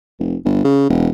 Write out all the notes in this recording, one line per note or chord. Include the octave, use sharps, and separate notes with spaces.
F1
G1
C#3
E1